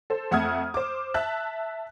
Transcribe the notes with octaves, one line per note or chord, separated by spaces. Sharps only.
A4 C5
F2 A3 F#5 D#6 F6 G#6
C5 D6
E5 A5 F#6